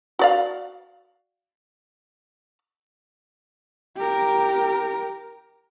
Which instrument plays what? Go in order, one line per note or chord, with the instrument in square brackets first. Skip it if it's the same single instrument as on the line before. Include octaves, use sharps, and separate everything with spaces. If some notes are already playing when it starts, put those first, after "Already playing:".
[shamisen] F#4 D5 F5
[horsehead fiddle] G4 A#4